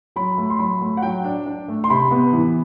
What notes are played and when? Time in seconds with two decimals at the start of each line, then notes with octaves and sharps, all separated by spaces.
0.16 F#3 B5
0.38 A3
0.50 C6
0.59 F#3 B5
0.81 A3
0.97 F#5
1.02 F#3 G5
1.24 D4
1.46 D4
1.68 A3
1.84 C6
1.90 C3 B5
2.11 B3
2.33 E3